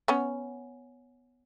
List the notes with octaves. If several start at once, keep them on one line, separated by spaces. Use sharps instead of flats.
B3 C#4